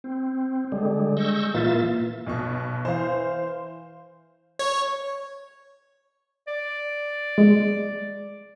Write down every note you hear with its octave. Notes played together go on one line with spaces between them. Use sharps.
C4
D3 G3 G#3
G#3 C#6 E6 G6 A#6
A#2 E3 A#3 F4 E5 A6
B1 B2 C#6
E3 C5 F5
C#5
D5
G#3